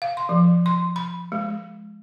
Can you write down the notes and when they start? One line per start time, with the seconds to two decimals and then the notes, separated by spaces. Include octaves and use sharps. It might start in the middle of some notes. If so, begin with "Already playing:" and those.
0.02 F5
0.17 C6
0.29 F3
0.66 C6
0.96 B5
1.32 G#3